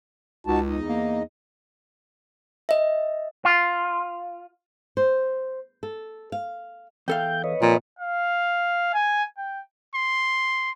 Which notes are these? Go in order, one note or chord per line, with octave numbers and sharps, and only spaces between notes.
C#2 D#4 F#4 A5
E2 D#4 D#5
A#3
D#5 E5
F4
C5
A4
F5
E2 A4 F5 G5 G6
B4 C#5 D#5
F2 A#2
F5
G#5
G5
C6